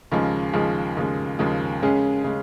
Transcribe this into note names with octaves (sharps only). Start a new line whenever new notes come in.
D#2 C#3 F3 G#3
D#2 C#3 F3 G#3
D#2 C#3 F3 G#3
D#2 C#3 F3 G#3
C#3 G#3 C#4 G#4
C#3 G#3